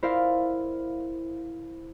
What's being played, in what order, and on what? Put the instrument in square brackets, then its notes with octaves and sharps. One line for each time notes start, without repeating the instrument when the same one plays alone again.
[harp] E4 A#4 C5 D5 F5